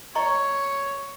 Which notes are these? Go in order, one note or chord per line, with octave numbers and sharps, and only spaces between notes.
C#5 D#5 A#5 C#6